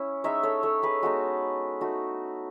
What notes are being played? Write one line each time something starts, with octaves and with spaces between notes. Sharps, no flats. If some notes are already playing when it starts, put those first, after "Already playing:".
Already playing: C#4 E4
G#3 D#4 C#5 E5
A4 C#5
A4 C#5
G#4 B4
G#3 B3 D#4 F#4 A4
A3 D#4 F#4